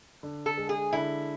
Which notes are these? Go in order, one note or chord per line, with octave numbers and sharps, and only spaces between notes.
D3
A4
G#3
G#4
D3 E4